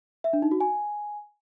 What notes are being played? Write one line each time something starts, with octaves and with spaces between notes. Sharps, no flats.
E5
D4
D#4
F#4
G#5